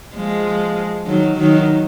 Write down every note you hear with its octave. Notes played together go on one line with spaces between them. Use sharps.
F3 G#3
D#3 F#3
D#3 F#3